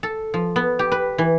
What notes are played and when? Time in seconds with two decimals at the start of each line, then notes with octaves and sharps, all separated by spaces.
0.03 A4
0.34 F3
0.56 B3
0.79 G4
0.92 B4
1.18 E3